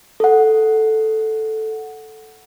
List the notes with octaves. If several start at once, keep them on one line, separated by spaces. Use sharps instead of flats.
A4 F#5